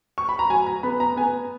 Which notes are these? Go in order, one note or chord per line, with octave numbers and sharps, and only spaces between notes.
C#6
B5
A#5
F#3 G#5
A#5
B3 B5
A#5
B3 G#5